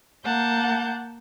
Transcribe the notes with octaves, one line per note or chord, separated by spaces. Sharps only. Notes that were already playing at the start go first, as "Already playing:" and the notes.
A#3 F#5 A5 G6